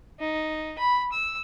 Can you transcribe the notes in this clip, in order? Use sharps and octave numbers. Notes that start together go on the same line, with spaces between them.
D#4
B5
E6